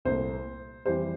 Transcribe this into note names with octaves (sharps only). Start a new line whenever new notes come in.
C2 A#2 A3 C5
F2 E3 G3 C5